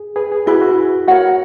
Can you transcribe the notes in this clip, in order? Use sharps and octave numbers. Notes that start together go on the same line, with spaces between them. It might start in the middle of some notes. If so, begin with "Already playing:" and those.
Already playing: G#4
G#4 B4
G#4
E4 F#4 G#4 B4
F#4
F#4 A#4 C#5 F#5